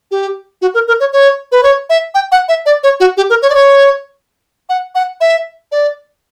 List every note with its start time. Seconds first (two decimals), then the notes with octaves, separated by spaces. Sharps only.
0.11 G4
0.62 F#4
0.74 A#4
0.88 A#4
1.00 C#5
1.13 C#5
1.52 B4
1.63 C#5
1.90 E5
2.15 G5
2.32 F#5
2.49 E5
2.66 D5
2.83 C#5
3.00 F#4
3.17 G4
3.30 A#4
3.42 C#5
3.50 D5
3.55 C#5
4.69 F#5
4.95 F#5
5.21 E5
5.72 D5